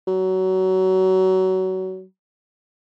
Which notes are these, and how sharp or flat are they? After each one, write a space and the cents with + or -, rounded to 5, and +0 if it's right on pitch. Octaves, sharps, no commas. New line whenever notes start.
F#3 +25